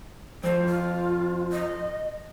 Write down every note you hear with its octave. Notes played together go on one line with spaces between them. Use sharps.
F2 F3 C5
F4
D#5